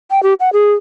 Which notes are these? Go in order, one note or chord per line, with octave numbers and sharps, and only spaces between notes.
G5
G4
F#5
G#4